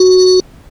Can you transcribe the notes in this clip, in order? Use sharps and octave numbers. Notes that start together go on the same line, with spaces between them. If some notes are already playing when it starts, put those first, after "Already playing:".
Already playing: F#4